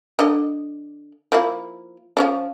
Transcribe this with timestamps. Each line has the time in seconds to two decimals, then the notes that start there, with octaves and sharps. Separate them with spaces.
0.19 D3 D4 D#5
1.32 F3 A#3 E4
2.17 F3 C#4 D4